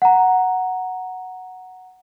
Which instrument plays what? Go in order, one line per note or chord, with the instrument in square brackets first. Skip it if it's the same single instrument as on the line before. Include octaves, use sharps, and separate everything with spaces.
[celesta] F#5 A#5